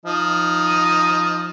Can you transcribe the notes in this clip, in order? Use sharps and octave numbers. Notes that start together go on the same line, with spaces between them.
F3 D#4